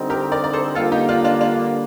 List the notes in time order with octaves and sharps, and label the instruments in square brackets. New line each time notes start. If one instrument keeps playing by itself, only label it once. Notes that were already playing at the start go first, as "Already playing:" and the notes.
Already playing: [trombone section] D3 G3 C4 D#4
[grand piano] G4 A#4
A#4 D5
D5
A4 C5
[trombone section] D3 G3 A#3 [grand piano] F4 A4
[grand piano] D#4 G4
D4 F4
D4 F4
D4 F4